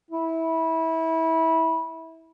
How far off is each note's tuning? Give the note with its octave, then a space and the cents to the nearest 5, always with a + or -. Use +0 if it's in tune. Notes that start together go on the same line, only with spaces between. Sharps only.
E4 -20